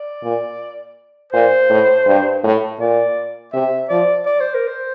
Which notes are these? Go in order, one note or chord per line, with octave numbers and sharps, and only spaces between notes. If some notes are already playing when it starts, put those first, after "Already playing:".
Already playing: D5
A#2
A#2 C5
A2
G2
A2
A#2 D5
C3 E5
F3 D5
D5
C5
A#4
C5